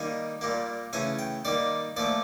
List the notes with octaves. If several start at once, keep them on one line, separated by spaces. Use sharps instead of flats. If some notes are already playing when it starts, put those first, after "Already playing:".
Already playing: D#3 G3 A#3 G#5
A#2 G3 A#3
C#3 E3 A3 G#5
G5
D#3 G3 A#3 D5
A#2 F3 A3 D5